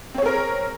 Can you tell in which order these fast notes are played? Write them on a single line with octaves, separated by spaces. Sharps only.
C4 C#5 G#4 A#4